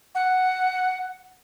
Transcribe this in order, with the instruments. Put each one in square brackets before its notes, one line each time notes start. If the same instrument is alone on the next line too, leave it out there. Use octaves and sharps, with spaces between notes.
[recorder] F#5